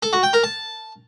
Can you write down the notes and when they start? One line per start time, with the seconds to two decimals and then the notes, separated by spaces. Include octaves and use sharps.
0.03 A4
0.13 F#4
0.23 G5
0.33 A#4
0.44 A5